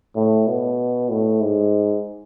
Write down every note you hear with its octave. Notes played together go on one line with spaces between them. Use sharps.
A2
B2
A2
G#2